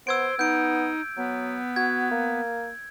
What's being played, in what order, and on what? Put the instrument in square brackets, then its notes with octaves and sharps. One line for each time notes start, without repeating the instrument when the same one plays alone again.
[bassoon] B3 [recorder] C5 [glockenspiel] E6 G#6 D7
[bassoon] B3 [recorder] D#4 [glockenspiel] G6 D7
[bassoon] F#3 [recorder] B3
[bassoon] F#4 [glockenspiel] G#6
[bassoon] A#3